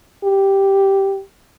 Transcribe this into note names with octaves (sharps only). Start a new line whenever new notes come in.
G4